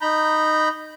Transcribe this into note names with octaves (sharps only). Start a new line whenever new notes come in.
D#4 A#5 B5 G6